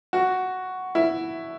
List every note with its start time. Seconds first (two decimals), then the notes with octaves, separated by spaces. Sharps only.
0.13 F#4
0.95 E4